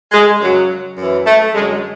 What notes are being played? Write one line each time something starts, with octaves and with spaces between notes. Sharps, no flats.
G#3
F#2 C#3 F#3
F#2 E3
A3
F#2 D3 F#3 G#3